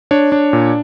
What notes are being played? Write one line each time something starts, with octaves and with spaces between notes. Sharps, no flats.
D4 C#5
D4
A#2